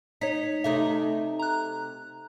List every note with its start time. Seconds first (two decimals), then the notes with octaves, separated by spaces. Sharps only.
0.21 D#4 C#5 B6
0.64 C3 A3 D#4 E5
1.39 A#5 F#6